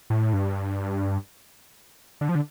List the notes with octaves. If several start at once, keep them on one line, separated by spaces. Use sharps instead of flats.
A2
G2
D3
F3
D3